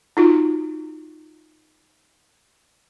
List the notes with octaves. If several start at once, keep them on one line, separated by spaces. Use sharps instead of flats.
D#4 F4 F#4